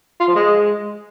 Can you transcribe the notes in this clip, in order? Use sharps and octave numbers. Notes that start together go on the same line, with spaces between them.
F4
F3
G#3